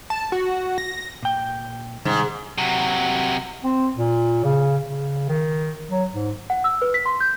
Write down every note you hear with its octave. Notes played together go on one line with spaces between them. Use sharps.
A5
F#4
A#6
A#2 G5
G#2 C3 D#3 G3
C3 F#3 F#5
C4
A#2
C#3
C#3
D#3
F#3
G#2
F#5
E6
B4
B6
C6
G6